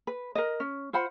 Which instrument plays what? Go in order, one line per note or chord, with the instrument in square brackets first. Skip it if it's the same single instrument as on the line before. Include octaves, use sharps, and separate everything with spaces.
[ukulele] B4
A#4 D#5
C#4
F4 C5 F#5 B5